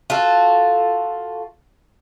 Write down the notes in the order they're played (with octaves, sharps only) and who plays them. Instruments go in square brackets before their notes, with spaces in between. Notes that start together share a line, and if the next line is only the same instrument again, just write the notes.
[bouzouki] F4 F#4 A4